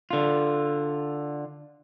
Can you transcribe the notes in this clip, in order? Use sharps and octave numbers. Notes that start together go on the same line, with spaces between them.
D3 F4